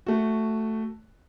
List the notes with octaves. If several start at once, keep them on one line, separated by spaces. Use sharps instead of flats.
A3 F#4